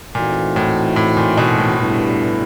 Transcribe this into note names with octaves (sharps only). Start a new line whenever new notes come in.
A#2 E3 A3 C4 D#4 F#4
A2
A2
A#2
B2
A2
G2 D3 G3 B3 E4